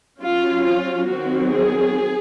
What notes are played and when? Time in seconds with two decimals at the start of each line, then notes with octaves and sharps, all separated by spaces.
0.20 F#3 C#4 F4
0.64 F4
1.09 D#3 F#3 C4 F#4
1.53 G#4